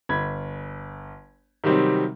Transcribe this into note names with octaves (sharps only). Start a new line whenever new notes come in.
G1 B5 G#6
C3 D#3 F#3 G3 C4 D#4